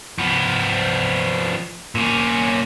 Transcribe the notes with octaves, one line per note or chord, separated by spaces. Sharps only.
F3 B3
A#2 C#4